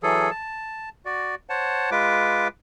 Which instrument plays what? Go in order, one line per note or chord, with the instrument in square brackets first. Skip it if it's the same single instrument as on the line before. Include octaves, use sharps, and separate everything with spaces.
[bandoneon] E3 F#3 G#4 A4
A5
F#4 D5
C5 C#5 F#5 A5
G#3 F4 B4 D6